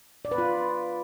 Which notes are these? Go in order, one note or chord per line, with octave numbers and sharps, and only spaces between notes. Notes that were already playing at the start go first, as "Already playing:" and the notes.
D5
B4
F4